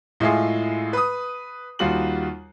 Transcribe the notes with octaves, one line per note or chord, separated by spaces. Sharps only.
A2 G#3 E4 F4 G#4
B4 D#6
D#2 G3 F4 F#4 F#7